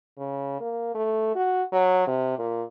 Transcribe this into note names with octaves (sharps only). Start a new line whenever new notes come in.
C#3
A#3
A3
F#4
F#3
C3
A#2